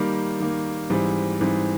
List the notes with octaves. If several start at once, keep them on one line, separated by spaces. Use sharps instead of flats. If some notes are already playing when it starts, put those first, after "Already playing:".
Already playing: D#3 G3 A#3
D#3 G3 A#3
G#2 E3 G3 C4
G#2 E3 G3 C4